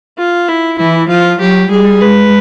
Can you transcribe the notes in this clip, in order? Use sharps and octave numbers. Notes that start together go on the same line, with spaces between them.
F4
E4
E3 E4
F3 F4
F#3 G4
G3 G#4
G#3 B4